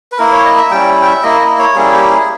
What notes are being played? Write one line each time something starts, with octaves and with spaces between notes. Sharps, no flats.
B4
A#3 E4 A#4
C#5
D#5
E5
G3 C#4 E4 G5
G5
E5
A#3 E4 D#5
D#5
C#5
G3 A#3 C#4 E4 G#4
G4
G#4